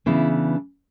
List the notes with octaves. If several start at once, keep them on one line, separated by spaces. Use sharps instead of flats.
C#3 E3 B3 D4 E4